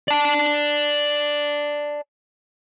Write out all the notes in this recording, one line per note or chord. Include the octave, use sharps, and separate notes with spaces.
D5 A5